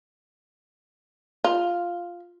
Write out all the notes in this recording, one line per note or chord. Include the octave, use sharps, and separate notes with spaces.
F4